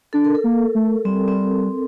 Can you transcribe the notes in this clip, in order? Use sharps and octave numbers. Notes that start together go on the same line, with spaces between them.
D4 A4
A#4
A4
A#3
A3
G3 C4
C4